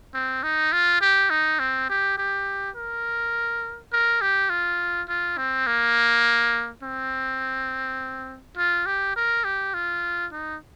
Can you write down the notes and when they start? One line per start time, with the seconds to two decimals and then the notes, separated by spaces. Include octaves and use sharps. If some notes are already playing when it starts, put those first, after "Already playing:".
0.14 C4
0.43 D#4
0.72 F4
1.01 G4
1.30 D#4
1.60 C4
1.89 G4
2.18 G4
2.76 A#4
3.92 A#4
4.21 G4
4.50 F4
5.08 F4
5.37 C4
5.67 A#3
6.83 C4
8.57 F4
8.86 G4
9.16 A#4
9.44 G4
9.74 F4
10.32 D#4